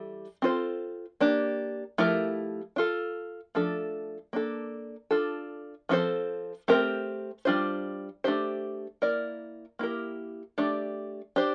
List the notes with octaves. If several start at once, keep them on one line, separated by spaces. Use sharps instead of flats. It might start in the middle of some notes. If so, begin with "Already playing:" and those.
Already playing: E3 G3 A4
C4 F4 A4 C5
A#3 D4 G4
F3 A3 E4 G4 A#4
D4 F4 A4
F3 A3 D4 A4
A#3 D4 A4
D4 F4 A4
F3 C4 F4 A4 C5
A3 C4 G4 A#4
G3 D4 F4 C5
A3 D4 G4 C5
A#3 E4 A#4 D5
A#3 E4 G4 A#4
A3 D4 G4 D5
D4 G4 C5